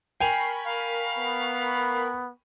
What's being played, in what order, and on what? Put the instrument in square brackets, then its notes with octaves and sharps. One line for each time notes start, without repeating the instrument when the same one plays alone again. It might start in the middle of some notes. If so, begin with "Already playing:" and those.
[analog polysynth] A#4 B5 C#6 [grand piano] G5 G#5 F7 [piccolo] C7
[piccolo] F5
[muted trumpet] B3